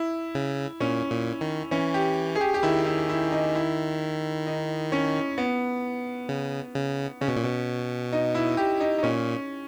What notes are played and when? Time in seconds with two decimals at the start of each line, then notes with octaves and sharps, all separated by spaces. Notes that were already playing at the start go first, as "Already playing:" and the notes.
Already playing: E4
0.35 C#3
0.80 A#2 C#4
1.11 A#2
1.41 D#3
1.71 E3 C#4
1.94 G4
2.36 G#4
2.41 G4
2.54 G4
2.63 D#3 E4
2.86 E4
3.09 E4
3.32 D#4
3.55 E4
4.47 D#4
4.92 C#4
5.38 B3
6.29 C#3
6.75 C#3
7.21 C#3 C#4
7.28 B2
7.36 A#2
7.44 B2
8.13 D#4
8.35 E4
8.57 G4
8.80 D#4
8.98 D#4
9.03 A#2 C#4